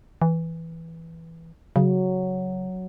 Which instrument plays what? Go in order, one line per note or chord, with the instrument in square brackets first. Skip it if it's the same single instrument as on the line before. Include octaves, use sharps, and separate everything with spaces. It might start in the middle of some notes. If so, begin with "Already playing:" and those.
[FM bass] E3
[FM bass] C#3 [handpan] F#3